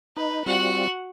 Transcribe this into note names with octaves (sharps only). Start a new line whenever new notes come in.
D#4 B4
G3 C4 F4 F#4 F#5